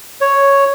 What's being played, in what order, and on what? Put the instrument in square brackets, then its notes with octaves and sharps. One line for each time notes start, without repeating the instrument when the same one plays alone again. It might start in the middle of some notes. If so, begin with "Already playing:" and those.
[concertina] C#5